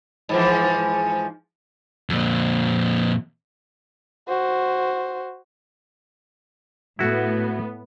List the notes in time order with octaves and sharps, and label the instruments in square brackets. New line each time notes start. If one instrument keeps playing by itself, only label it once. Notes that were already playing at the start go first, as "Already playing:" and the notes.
[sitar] G#2 E3 F3
[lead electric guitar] F2 A#2
[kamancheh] F#4 C5
[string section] A2 B3 [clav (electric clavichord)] E4 F#4 A4